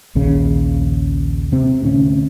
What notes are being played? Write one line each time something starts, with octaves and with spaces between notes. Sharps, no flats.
A#1 D#2 C#3
C3 C4
D2 A2 C#4